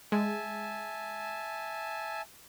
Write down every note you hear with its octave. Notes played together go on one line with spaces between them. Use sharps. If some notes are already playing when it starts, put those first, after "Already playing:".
G#3 E5 G#5 A5